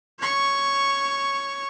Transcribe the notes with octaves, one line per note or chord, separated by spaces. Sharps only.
C#5 C#6